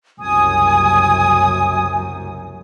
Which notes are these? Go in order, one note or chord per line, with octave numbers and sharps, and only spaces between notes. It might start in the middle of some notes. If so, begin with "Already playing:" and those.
F#1 C2 F#2 G#5 D#6